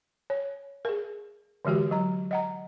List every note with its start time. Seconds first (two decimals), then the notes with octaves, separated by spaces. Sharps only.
0.30 C#5
0.85 G#4 A#4
1.65 D3 E3 G#3 F#4 G4
1.91 F#3 A#5
2.31 D#5 F#5 A#5